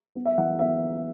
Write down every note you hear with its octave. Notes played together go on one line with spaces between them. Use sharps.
B3
E5
E3 F#5
B3 E5